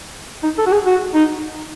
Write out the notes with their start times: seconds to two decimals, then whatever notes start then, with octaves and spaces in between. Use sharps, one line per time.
0.43 D#4
0.58 A4
0.66 F#4
0.72 G#4
0.86 F#4
1.14 D#4